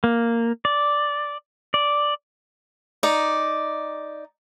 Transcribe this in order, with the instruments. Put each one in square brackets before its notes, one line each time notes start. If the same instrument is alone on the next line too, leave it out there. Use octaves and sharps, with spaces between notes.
[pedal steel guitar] A#3
D5
D5
[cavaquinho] D#4 D5 A#5